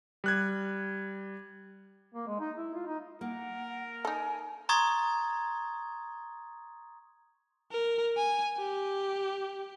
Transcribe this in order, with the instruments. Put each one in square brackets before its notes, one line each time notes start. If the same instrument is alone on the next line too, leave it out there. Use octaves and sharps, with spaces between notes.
[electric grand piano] G3 F#6 G#6
[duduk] A#3
G#3
D#4
E4
F4
D#4
[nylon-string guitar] A#3 [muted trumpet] A#4 [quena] F#5
[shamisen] D#4 A4 [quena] G#5
[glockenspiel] A#5 C6 C#6 D#6 G#6 A6
[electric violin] A#4
G#5
G4